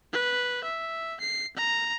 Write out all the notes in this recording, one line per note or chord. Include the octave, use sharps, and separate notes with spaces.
B4
E5
C7
A#5